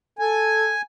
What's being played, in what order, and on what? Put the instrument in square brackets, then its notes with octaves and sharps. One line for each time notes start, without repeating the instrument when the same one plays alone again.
[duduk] A4 [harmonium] G#5